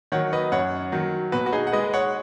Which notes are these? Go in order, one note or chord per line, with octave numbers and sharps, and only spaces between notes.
D#3 F#3 C#5 F#5
B4 D#5
F#2 C#5 F#5
D#3 F#3
B2 F#4 B4
F#4
D#4 G#4
F#5
G#3 B4 D#5
C#5 F#5